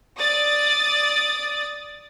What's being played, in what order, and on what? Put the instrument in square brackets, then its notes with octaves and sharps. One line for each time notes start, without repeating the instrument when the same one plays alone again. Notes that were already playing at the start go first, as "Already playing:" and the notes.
[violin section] D5 D#6 A6